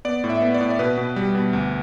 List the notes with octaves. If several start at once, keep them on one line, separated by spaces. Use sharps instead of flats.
B3 D5
A2
E5
B3
D5
A2
D5
B2 B4
B2
G3
B2
D2